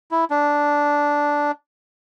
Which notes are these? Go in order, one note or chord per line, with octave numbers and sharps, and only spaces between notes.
E4
D4